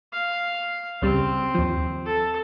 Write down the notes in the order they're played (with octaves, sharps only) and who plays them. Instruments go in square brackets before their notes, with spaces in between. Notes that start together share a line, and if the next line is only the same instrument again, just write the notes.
[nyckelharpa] F5
[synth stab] C#2 C#3 G3 [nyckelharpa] C4
[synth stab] D#2 F3
[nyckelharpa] A4